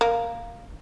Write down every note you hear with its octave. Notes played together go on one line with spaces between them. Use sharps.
A#3